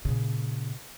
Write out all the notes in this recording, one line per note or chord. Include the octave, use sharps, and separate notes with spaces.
A#2 C#3